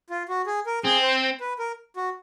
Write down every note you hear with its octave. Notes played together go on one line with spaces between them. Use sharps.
F4
F#4
G#4
A#4
C4 G#4
C5
B4
A#4
F#4